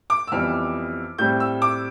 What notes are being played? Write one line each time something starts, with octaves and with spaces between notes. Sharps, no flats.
D6
E6
F2 E3 G3 B3 F6
A2 G3 C4 G6
E6
D6